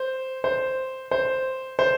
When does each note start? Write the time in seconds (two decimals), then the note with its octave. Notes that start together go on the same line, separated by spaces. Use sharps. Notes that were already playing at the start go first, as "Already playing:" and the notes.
Already playing: C5
0.44 C5
1.11 C5
1.79 C5